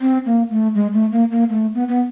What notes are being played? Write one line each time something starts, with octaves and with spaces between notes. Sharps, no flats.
C4
A#3
A3
G#3
A3
A#3
A#3
A3
B3
B3